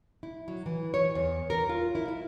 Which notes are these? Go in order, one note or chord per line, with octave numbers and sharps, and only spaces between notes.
E4
F#3
E3
C#5
E2
A#4
F4
E4
E5